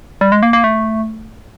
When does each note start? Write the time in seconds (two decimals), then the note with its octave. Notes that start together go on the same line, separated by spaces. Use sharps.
0.21 G3
0.32 G#3
0.43 A#3
0.53 A#3
0.64 A3